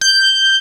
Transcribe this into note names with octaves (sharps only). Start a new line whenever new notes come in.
G6